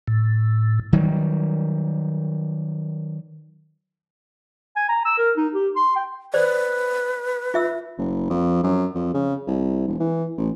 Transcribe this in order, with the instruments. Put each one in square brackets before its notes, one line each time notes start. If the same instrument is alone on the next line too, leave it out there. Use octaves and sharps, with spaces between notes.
[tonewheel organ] A2
[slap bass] D#3 F#3 G3
[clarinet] G#5
A#5
E6
A#4
D#4
G4
C6
G5
[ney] B4 [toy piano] C5 D5
[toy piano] F4 E5 E6
[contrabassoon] F#1
F2
F#2
F2
C#3
C2
E1
E3
A1